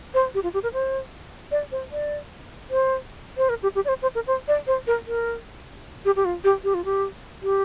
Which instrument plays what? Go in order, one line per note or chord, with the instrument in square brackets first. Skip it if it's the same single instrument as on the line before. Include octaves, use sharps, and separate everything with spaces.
[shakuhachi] C5
G4
F4
G4
A#4
C5
D5
C5
D5
C5
C5
A#4
G4
G4
D5
C5
C5
A#4
C5
D5
C5
A#4
A#4
G4
G4
F4
G4
G4
F4
G4
G4